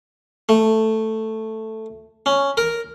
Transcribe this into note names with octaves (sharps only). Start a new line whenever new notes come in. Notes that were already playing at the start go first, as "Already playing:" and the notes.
A3
C#4
A#4